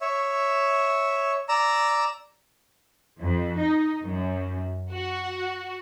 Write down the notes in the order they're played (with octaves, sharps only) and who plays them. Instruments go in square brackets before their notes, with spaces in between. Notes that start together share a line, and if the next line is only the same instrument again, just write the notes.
[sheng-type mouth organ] C#5 E5
D5 A#5 E6
[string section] F2
D#4
F#2
F#4